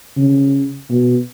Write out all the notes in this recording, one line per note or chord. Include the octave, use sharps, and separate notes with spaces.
C#3
B2